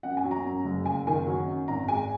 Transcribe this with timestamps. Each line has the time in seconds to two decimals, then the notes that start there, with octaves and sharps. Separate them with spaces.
0.03 F#2 F#5
0.17 G#5
0.24 F#3
0.31 A#5
0.45 F#2
0.65 F#1
0.86 F#1 G#5
1.07 D#3 G#5
1.26 F#3
1.47 F#2
1.68 G#1 A#5
1.88 G#3 G#5